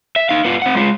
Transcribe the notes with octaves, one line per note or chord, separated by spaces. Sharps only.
E5
D#4 F5
B3 F4
C4 F#5
G#3 F4